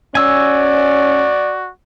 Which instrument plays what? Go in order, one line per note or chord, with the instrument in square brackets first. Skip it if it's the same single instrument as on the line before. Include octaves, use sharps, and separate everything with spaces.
[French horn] C#4 [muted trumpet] F#4 [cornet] D5 [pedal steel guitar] G#5 E6